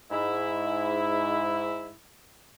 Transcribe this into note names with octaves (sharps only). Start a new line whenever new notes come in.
G#2 E4